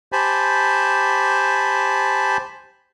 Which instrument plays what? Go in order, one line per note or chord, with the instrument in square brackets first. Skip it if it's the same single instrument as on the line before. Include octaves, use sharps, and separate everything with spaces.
[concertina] G4 C5 G#5 A5 B5